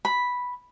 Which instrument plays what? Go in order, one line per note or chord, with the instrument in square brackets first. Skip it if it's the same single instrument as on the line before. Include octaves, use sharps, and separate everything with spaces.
[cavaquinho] B5